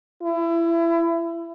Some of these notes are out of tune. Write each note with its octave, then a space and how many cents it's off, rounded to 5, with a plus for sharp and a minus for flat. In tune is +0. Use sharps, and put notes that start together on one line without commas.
E4 +25